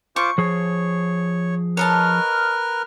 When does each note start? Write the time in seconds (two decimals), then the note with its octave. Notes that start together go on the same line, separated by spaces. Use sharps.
0.16 F4 C5 C#6 D6
0.38 F3 G#4 C#5
1.77 A#4 B4 C#5 D#5 A5 F6